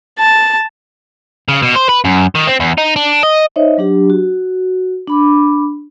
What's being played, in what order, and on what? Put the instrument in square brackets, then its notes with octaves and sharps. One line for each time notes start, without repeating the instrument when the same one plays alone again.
[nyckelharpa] A5
[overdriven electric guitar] C#3
B2
C5
B4
F#2
D#3
C4
E2
D#4
D4
D#5
[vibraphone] D#4 C5 C#5 D#5 E5
F#3 D4 G4
F#4
D4 B5 D6